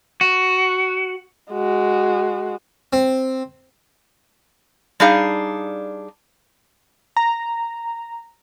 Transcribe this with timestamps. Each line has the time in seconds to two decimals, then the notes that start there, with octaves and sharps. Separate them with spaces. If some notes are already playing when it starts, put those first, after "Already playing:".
0.21 F#4
1.52 G#3 F#4
2.93 C4
5.00 G3 D4 D#4 G#4 F5
7.17 A#5